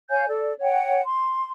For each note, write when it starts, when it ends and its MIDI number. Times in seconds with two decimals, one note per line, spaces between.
0.10 0.26 73
0.10 0.26 77
0.10 0.26 80
0.10 0.26 91
0.27 0.53 69
0.27 0.53 74
0.60 1.01 73
0.60 1.01 78
0.60 1.01 79
1.03 1.52 84